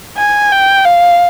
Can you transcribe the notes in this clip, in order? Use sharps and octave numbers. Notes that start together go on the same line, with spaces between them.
G#5
G5
F5